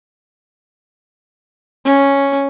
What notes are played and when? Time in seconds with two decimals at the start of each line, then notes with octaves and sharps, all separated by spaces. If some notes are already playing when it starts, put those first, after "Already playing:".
1.85 C#4